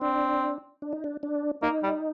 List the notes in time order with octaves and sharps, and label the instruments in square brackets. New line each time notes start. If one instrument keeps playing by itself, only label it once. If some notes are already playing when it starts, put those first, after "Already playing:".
[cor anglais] C4 [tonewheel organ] D4
[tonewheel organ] D4
D#4
D4
D4
[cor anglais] A#3 [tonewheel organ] D#4
[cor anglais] G3